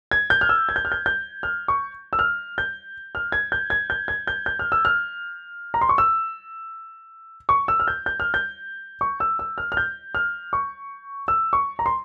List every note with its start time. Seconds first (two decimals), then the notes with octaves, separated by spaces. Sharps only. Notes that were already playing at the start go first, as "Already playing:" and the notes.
0.11 G#6
0.30 G6
0.41 F6
0.49 E6
0.69 G#6
0.76 G6
0.85 F6
0.92 G6
1.06 G6
1.43 F6
1.68 C#6
2.13 E6
2.19 F6
2.58 G6
3.15 F6
3.32 G#6
3.52 G6
3.70 G#6
3.90 G6
4.08 G#6
4.27 G6
4.46 G6
4.59 F6
4.72 E6
4.85 F6
5.74 A#5
5.81 C6
5.89 C#6
5.98 E6
7.49 C#6
7.68 E6
7.80 F6
7.88 G6
8.06 G6
8.20 F6
8.34 G6
9.01 C#6
9.20 E6
9.39 E6
9.58 F6
9.72 F6
9.77 G6
10.15 F6
10.53 C#6
11.28 E6
11.53 C#6
11.79 A#5
11.86 C6